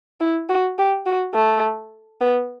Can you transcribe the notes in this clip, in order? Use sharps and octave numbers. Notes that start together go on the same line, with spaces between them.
E4
F#4
G4
F#4
A3
B3